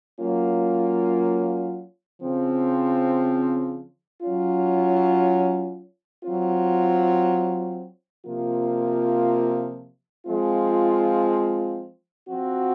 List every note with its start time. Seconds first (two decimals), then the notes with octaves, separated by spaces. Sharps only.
0.20 F#3 A#3 C#4 F4
2.21 C#3 F3 C4
4.22 F#3 C#4 F4
6.24 F#3 C4 F4
8.25 C3 F3 A#3 F4
10.26 F3 G#3 C4 F4
12.28 F3 C4 F#4